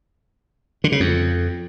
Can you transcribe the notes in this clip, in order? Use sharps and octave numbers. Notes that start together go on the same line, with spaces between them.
D3
C#3
F2